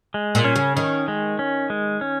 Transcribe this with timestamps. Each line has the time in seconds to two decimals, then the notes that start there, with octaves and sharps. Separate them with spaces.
0.14 G#3
0.35 A#2
0.44 C#4
0.56 C#3
0.76 D#3 C#4
1.08 G#3
1.39 C#4
1.70 G#3
2.01 C#4